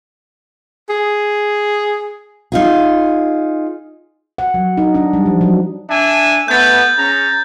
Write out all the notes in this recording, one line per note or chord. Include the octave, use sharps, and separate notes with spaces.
G#4
D#4 F4 G#4
F#5
F#3
D#4
D4
G3
F3
F#3
D4 E5 G#5
A3 B3 G6 A6
C#4 G#4 A#5